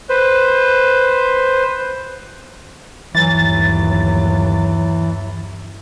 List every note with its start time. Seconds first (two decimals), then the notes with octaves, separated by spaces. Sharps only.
0.09 B4 C5
3.15 G1 D#2 E3 F#3 A6